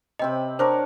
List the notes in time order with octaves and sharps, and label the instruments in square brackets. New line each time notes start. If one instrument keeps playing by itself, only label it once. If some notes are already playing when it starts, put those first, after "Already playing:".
[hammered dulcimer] C3 C4 B5 [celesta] D#5
[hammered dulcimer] D4 A#4 C#5 [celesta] C5